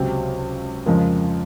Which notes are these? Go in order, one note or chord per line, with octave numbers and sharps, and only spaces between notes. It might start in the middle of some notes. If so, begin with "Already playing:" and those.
Already playing: C#2 C3 F#3 C4
F2 C#3 F3 G#3 A#4